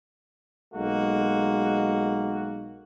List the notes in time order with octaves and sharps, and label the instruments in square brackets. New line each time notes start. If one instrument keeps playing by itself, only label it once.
[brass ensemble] B1 G#3 A#3 F#4